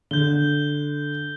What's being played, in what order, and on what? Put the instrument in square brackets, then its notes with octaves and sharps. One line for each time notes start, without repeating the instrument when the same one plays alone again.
[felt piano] D3 [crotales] G6 G7